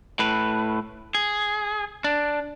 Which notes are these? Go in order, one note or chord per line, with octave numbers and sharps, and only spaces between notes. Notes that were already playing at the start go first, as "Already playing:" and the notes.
A2 B4
G#4
D4